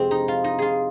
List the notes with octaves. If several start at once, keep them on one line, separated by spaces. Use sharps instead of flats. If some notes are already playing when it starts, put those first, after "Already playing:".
Already playing: F2 C3 F3 G#3 C4 G#4
D#4
F4
D#4
F4 G#4